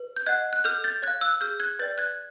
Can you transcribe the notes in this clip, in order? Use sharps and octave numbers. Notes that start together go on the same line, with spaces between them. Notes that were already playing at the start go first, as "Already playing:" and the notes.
Already playing: B4
G6
D#5 F#5 F#6 G#6
F#6
A4 F6 G6
G6 A6
C#5 F#6 G#6
F5
E6 F#6
G#4 F6 G6
F#6 G#6
B4 D5 G5 G6 A6
F#6 G#6